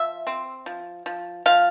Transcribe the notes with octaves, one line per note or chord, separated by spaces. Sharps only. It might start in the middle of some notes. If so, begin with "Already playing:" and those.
Already playing: F3 E5
C4
F3
F3
F3 F5